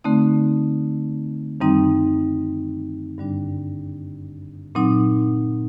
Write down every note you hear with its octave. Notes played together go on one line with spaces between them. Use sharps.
D3 A3 C4 D#4
F#2 D#3 G3 C4 D#4
G2 D3 G3 D4
A#2 F#3 C4 D#4